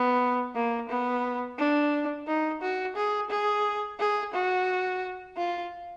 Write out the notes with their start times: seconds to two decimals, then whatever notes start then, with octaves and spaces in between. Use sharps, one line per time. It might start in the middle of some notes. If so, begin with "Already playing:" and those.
Already playing: B3
0.55 A#3
0.89 B3
1.58 D4
2.27 D#4
2.61 F#4
2.96 G#4
3.30 G#4
3.99 G#4
4.34 F#4
5.37 F4